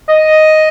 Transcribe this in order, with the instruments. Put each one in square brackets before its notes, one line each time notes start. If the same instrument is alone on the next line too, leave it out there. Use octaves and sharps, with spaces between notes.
[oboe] D#5